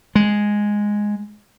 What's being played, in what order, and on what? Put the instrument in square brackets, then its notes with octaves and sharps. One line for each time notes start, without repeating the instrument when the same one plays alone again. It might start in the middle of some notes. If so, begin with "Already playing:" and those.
[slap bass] G#3